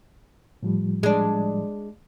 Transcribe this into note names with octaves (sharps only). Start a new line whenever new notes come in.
A2 F3 G3
G#3 D4